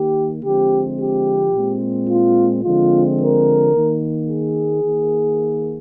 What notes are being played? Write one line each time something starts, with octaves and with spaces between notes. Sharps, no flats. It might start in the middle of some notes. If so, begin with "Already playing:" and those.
Already playing: D#3 A#3 G4
D3 F3 G#3 C4 G4
G4
A#2 G#3 C4
F4
D3 F3 G#3 C4 F4
A#4
D#3 A#3
G#4
D#3 A#3